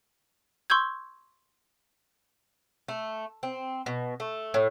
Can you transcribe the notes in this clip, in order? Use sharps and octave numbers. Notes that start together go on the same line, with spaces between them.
C6 C#6 E6 G6 G#6
A3
C4
B2
A3
A2